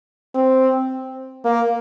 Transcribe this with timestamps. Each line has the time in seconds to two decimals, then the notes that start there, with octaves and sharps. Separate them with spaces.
0.35 C4
1.45 A#3